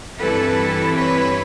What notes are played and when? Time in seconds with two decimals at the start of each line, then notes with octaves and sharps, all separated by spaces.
0.18 G2 E3 G3 C4 E4 A4 B4
0.94 B4 C#5